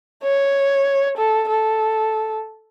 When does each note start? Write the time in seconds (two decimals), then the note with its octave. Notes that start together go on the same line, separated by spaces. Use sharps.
0.23 C#5
1.17 A4
1.49 A4